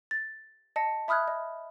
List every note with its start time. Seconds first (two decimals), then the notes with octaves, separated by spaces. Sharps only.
0.11 A6
0.76 D#5 A5 A#6 C#7
1.08 E5 B5 D#6 F6 F#6 G#6
1.28 D#5